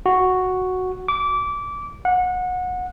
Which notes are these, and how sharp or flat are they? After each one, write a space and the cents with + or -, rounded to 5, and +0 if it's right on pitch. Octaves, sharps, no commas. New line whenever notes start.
F#4 +0
D6 -20
F#5 -25